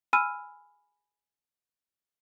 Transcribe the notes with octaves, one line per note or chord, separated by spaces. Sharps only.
G#5 B5 E6 F6 D#7